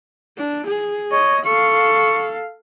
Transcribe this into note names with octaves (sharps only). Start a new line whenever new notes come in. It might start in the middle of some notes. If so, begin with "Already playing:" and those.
D4
G#4
C#5 D#5
A4 F5 C#6